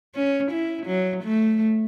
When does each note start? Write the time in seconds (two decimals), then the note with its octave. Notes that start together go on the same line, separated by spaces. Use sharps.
0.15 C#4
0.51 E4
0.86 F#3
1.23 A3